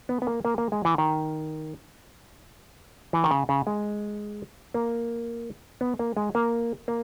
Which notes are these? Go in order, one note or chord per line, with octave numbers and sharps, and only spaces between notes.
B3
B3
A#3
A#3
A#3
G#3
E3
D#3
E3
D#3
C#3
C#3
G#3
A#3
B3
A#3
G#3
A#3
A#3